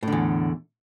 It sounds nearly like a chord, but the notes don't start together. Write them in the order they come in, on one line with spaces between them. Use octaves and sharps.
A2 D3 E2